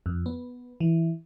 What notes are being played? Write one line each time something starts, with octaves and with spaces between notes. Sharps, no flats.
F2
B3
E3